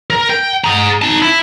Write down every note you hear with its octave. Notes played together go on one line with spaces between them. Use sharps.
A#4
G5
G#4 A#5
D#4 A5
E4